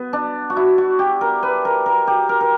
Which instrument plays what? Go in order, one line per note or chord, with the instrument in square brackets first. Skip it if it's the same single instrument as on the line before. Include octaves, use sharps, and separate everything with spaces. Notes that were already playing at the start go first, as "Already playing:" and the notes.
Already playing: [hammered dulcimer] B3
D4
F#4
E4
F#4
G4
A#4
B4
A#4
A#4
G4
A#4
A#4